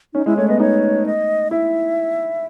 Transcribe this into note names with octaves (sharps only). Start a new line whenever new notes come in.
C#4 D#4
G#3 E4
A3 C#5
B3 D#5
D#4 C#5
D#5
E4 E5